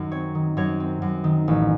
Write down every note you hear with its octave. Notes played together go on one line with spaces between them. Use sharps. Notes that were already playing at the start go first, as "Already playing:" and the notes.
Already playing: F#2 D#3
C4 C#5
D#3
F#2 C#5
C4
F#2
D#3
A1